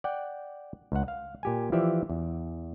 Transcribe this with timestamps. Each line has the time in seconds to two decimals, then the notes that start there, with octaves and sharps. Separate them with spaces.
0.04 D5 F#5 G5
0.92 C#2 F#5
1.08 F5
1.43 A#2 G4 G#5
1.72 E3 F3 G4 D5 E5
2.10 E2